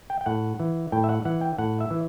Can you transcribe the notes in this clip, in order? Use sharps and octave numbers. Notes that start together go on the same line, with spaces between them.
G5
G5
A2 F#5
E3
A2 G5
E5
F#5
E3 F#5
G5
A2 F#5
E5
E3